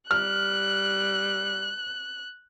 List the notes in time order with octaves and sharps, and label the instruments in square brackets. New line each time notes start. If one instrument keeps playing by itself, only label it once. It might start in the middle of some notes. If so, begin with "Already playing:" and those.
[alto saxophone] G3 [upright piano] F6 [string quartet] F#6